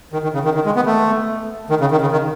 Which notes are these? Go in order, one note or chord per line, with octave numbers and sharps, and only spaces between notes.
D#3
D#3
C#3
D#3
D#3
G#3
B3
A3
D#3
C#3
D#3
C#3
D#3